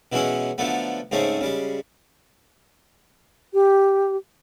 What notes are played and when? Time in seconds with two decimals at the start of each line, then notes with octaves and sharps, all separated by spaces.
0.12 B2 E3 F#3 G#3 C#4 E4
0.58 D3 F3 F#3 A3 B3
1.11 G#2 C#3 G#3 A3 C4 C#4
1.41 C#3 G3 G#3
3.54 G4